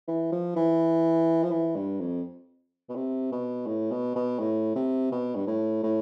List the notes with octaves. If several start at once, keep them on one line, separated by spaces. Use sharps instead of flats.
E3
F3
E3
F3
E3
G2
F2
B2
C3
B2
A2
B2
B2
A2
C3
B2
G2
A2
A2